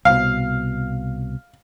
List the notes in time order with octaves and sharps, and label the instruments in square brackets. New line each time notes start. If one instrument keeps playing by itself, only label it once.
[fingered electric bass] C2 B2 [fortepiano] F5